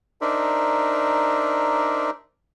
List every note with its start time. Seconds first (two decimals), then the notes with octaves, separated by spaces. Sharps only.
0.21 D4 D#4 A#4 C5 D5 E5